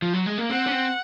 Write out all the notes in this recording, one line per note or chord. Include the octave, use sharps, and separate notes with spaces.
F3
F#3
G#3
A#3
C4 F#5
C#4
C4